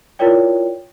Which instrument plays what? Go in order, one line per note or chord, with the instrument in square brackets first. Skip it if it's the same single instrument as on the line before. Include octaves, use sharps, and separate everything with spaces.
[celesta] E4 F4 A#4 C#5 D5 G5